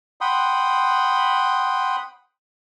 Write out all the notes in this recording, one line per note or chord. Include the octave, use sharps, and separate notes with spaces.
F#5 G5 B5 C6 D#6